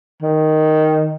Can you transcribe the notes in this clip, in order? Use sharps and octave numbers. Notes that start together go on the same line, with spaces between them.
D#3